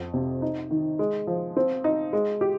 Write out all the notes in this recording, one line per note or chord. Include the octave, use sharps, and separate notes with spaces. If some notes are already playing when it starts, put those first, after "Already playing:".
Already playing: F2
C3
D#4
D#3
G#3
F3
C4
D#4
G#3
G4